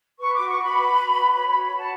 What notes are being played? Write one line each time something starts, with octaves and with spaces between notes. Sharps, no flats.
B4 C#6
F#4 D6
C#6
F#4 B5
B4
F#4
B4
C#5 B5
B5
F#4
B5
F#4 A5